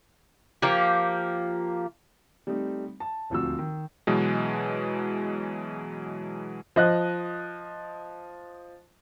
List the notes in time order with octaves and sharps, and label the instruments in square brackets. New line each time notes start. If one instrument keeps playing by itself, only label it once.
[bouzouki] F3 A#3 G4
[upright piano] G3 A3 C4 D#4
A5
D#1 D2 F3 C4 F#4 E6
D#3
[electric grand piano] B2 E3 F#3 G#3
[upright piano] F3 D#5 F#6